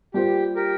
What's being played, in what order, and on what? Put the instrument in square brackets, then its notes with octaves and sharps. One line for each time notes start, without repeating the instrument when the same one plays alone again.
[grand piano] G3 A#3 F4 C5 [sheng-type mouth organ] G4
[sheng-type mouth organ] G4 A#4